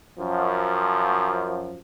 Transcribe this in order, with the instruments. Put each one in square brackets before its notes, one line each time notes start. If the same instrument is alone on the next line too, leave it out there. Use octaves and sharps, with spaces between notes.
[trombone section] F#2 F3